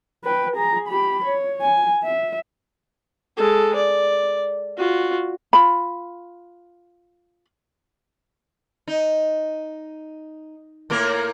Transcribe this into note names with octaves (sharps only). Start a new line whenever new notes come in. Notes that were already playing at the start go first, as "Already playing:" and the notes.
B4 G5
G#4 A#5
G4 B5
C#5
G#5
E5
G#3 A4
D5
F4 F#4
F4 B5
D#4
A2 A#3 A#4